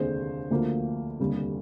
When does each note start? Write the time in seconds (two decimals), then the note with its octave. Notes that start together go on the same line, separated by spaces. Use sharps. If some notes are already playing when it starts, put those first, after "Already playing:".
Already playing: F1 D#2 D3 G#3 D4 G#4 C5
0.50 D2 D3 F3 A#3
1.19 F1 D#2 D3 G3